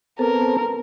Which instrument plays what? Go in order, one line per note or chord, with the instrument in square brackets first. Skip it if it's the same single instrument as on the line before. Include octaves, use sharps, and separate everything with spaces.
[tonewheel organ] B3 C4 A4 [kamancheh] A#4